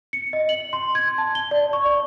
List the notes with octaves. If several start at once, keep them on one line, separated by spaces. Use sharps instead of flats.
C#7
D#5
F#7
C6
G#6
A5
G7
D5
C#6
D5